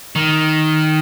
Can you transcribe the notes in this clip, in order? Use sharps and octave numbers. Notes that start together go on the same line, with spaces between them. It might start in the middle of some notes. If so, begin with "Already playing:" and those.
D#3